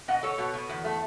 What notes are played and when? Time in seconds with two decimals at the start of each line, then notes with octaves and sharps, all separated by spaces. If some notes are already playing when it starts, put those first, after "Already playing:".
0.08 B2 D#5 F#5
0.23 B2 A4 C#5
0.38 B2
0.54 B2
0.69 E2
0.85 A3